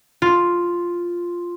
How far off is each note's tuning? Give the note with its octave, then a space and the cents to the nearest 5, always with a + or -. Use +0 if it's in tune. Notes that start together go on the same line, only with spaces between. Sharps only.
F4 +0